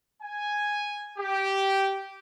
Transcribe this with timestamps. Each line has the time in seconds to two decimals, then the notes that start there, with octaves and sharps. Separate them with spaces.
0.22 G#5
1.19 G4